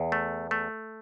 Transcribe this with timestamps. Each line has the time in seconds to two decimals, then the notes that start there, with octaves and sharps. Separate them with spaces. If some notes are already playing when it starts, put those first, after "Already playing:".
Already playing: E2
0.12 A3
0.51 A3